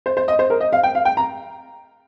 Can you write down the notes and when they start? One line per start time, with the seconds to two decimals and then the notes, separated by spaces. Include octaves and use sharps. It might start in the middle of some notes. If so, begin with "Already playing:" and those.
0.06 C5
0.17 C5
0.28 D#5
0.39 C5
0.50 A#4
0.61 D#5
0.73 F5
0.83 G5
0.95 F5
1.05 G5
1.17 A#5